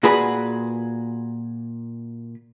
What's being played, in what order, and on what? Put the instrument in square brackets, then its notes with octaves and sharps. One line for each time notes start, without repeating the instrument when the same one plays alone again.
[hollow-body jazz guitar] A#2 F#4 G#4 B4 B5